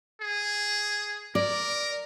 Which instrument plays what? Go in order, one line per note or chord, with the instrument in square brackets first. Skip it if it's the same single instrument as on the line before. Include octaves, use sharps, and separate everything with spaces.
[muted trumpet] G#4
[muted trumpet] A#4 [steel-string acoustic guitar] D5